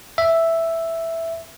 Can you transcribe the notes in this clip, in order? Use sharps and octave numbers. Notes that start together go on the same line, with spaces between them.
E5